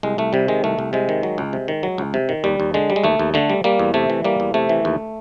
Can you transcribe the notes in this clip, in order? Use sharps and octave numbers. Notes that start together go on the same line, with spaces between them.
C2 G#3
C2 A3
C3 G3
D#3 G#3
C2 A3
C2
C3 G#3
D#3
F#3
C#2
C3
D#3
F#3
C#2
C3
D#3
D#2 G3
D#2
D3 G#3
G3
G#3
D#2 A3
D#2
D3 A3
G3
G3 A#3
E2
C3 A3
E3
G3 A#3
E2
C3 A3
E3
D#2